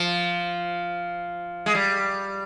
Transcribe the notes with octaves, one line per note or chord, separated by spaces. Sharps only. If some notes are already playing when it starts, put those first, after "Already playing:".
Already playing: F3
G#3
G3